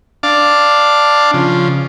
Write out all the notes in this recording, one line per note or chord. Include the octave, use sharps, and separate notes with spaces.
D4 F5 A5 D6
C#3 F3